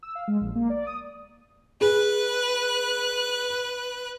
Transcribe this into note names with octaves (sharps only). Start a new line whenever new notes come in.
E6
F5
G#3
A#1
A#3
D5
D#6
G#4 B4 F#6